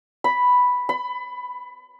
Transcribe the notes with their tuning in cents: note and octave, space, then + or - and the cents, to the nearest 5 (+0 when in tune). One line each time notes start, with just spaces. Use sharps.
B5 +0
B5 +30